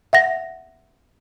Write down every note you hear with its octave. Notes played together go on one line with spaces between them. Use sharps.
E5 F#5 A#6